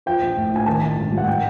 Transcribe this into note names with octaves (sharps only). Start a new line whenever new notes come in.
F3 G5
A#1
A2
A#1 G#5
D#3 A5
A1
G#2
G3
F#5
G3 G5